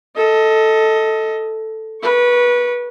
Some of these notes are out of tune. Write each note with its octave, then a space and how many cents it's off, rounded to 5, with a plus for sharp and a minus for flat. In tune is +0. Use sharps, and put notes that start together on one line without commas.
A4 +0 D#5 +20
B4 -25 C#6 +0